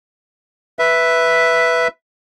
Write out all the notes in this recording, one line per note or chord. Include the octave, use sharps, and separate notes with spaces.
B4 E5